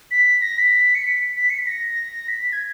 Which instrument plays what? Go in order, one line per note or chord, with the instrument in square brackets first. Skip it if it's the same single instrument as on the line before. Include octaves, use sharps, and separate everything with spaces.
[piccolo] B6
A#6
B6
C#7
B6
B6
C#7
B6
A#6
B6
G#6